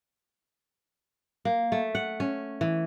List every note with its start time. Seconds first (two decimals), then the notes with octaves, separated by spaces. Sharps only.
1.45 A#3
1.72 A3
1.95 F#5
2.20 C#4
2.61 E3